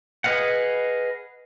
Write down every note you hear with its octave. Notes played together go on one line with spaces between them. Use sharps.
G#4 B4 D#5 F5 F#5